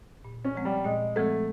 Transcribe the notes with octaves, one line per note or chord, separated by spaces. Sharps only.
A#2
C#4
F3 G#3 C4
G3
A#2 G#3
F3 G#3 A3 C4